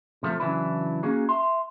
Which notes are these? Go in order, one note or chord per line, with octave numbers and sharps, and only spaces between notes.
C3 F3 A3
C#3 E3 F#3 D4 E4 B4
A#3 C#4 D#4 F#4 G#4
E5 C6